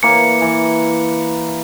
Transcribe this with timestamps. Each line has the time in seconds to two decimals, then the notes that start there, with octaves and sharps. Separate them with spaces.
0.03 E3 A#3 D6 C#7
0.42 E3